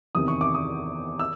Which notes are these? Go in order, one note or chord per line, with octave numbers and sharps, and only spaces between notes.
E2 C3 D#3 D#6
C#6
D6
D#6
E6